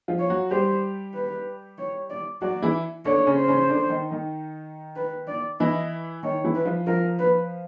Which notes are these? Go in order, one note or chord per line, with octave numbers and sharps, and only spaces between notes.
F3 F4
C#5
F#3 F#4
G3 G4 C5
B4
C#5
D5
F#3 F#4 D5
E3 E4
D3 D4 C#5
C#3 C#4
C5
C#3 C#4
D3 D4
D#3 D#4
D#3 D#4
B4
D5
E3 E4 D#5
D#3 D#4 C#5
E3 E4
B4
F3 F4
F3 F4 A#4
B4